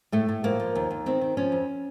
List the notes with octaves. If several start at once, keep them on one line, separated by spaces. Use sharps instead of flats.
A2 A3
A2
F3 A#3
F3
D#2
D#2
D#3 C4
D#3
F3 C#4
F2